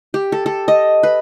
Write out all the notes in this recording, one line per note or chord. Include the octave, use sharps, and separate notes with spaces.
G4
A4
A4
D#5
B4